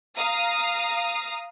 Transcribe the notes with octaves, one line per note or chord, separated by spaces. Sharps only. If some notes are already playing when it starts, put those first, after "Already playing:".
F5 A#5 D#6